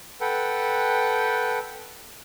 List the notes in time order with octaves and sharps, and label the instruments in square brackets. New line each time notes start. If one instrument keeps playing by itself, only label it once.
[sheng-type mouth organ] A4 B4 F#5 G5